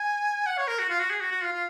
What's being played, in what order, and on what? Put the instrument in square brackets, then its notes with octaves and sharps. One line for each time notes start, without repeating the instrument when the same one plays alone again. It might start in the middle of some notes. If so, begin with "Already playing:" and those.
Already playing: [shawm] G#5
F#5
C#5
A#4
F#4
F4
F#4
G#4
F#4
F#4
F4
F4